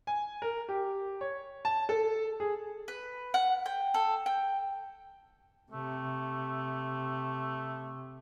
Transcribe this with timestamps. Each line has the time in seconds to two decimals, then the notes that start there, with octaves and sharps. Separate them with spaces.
0.07 G#5
0.42 A#4
0.69 G4
1.21 C#5
1.65 A5
1.89 A4
2.40 G#4
2.88 B4
3.34 F#5
3.66 G5
3.94 A4
4.26 G5
5.72 C3 A3